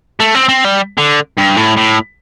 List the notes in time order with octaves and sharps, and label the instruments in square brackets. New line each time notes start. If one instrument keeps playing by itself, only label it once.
[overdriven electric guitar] A3
C4
C4
G3
D3
G2
A2
A2